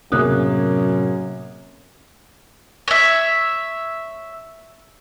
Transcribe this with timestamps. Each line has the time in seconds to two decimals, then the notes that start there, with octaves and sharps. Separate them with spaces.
0.12 F#2 A2 C3 A#3 B3 G#4 D#6 F#6
2.88 C#5 E5